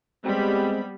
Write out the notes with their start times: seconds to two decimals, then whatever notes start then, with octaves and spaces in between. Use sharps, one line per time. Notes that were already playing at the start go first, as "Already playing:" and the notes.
0.25 G3 G#3 B3 C4 B5